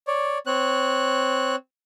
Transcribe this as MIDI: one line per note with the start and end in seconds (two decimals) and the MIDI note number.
0.07 0.38 73
0.07 0.38 74
0.47 1.56 60
0.47 1.56 73
0.47 1.56 90